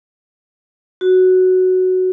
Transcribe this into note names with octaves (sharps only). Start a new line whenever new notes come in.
F#4